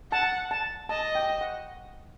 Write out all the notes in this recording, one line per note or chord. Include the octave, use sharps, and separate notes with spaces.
F#5 A5
A5
D#5 A5
G5
F#5